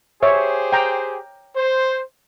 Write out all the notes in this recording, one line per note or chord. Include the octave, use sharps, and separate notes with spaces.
G4 G#4 C5 C#5 E5
G5 A#5
C5